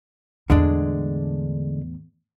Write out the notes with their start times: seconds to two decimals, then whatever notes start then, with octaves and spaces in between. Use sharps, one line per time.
0.50 E2 A2 D3 G#3 D4